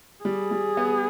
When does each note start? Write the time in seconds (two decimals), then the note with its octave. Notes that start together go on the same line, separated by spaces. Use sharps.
0.24 G3 G#4
0.51 G3
0.77 B3